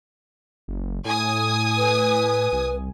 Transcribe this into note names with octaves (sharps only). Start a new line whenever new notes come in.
F#1
A2 G#5 D#6
B4
C2